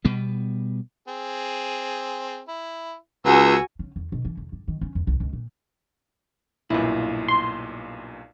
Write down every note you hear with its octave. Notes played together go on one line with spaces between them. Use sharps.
B2 G3 B3
C4 G#4
E4
C#2 B3 F#4 G#4 G#5 E6
C#3
E2
B2
E3
E2
G2
D#3
C#4
E2
C2
C#2
A#2
B1 G2 A#2 E4 B4
C6